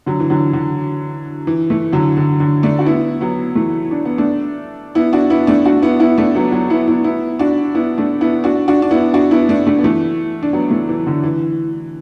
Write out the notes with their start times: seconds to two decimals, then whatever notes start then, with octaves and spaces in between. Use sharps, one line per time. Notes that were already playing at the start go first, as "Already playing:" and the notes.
0.06 D3 F#3
0.20 E3
0.30 D3 F#3
0.53 D3
1.47 E3
1.70 E3 A3
1.93 D3 F#3
2.17 D3
2.40 D3
2.63 A3 D4
2.79 F#4
2.86 B3 E4
3.21 F#3 B3
3.55 E3 A3
3.91 D4
4.05 B3
4.18 A3 D4
4.95 B3 E4
5.13 D4 F#4
5.30 B3 E4
5.47 A3 D4
5.65 D4 F#4
5.82 B3 E4
6.00 B3 E4
6.18 A3 D4
6.35 F#3 B3
6.52 F#3 B3
6.70 B3 E4
6.88 B3 E4
7.04 B3 E4
7.39 D4 F#4
7.75 B3 E4
7.98 A3 D4
8.21 B3 E4
8.44 D4 F#4
8.68 D4 F#4
8.82 D4
8.91 B3 E4
9.14 D4 F#4
9.31 B3 E4
9.49 A3 D4
9.67 A3 D4
9.79 B3
9.84 E3 A3
10.43 D4
10.53 F#3 B3
10.71 E3 A3
10.89 E3
11.07 D3
11.23 E3